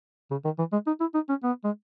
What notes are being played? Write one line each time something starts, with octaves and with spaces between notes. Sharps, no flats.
C#3
D#3
E3
G#3
D#4
E4
D#4
C#4
B3
G#3